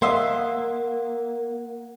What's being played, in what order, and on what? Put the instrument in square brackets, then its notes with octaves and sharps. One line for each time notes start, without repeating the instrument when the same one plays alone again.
[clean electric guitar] A#3 [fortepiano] D#5 E5 C6 [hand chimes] F#5